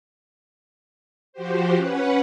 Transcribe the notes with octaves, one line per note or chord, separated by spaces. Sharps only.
F3 F#4 G4 C5
C#4 B4 F#5